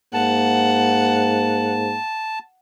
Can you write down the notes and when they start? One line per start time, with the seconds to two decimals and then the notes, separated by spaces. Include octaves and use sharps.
0.14 G#2 A#3 F#5 A5